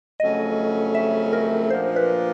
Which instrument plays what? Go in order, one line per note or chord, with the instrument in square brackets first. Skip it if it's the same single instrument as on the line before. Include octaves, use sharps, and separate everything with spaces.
[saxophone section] F2 C#3 F#3 A3 C#4 [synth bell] D#5
[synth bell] E5
A#4
[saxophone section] A#2 F3 A#3 D4 F4 [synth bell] C5
[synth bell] B4